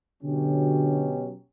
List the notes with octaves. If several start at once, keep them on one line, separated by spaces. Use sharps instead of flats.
B2 D3 F#3 C#4 G4